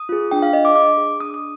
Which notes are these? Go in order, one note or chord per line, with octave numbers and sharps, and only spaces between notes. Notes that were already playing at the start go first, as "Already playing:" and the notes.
Already playing: D#6
F4 G#4
D4 G5
F5
G#4 D#5
D6
D4 D6
G#4
D4 D#6
D#6